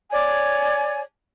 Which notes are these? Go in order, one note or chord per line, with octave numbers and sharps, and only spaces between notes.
C#5 D5 G#5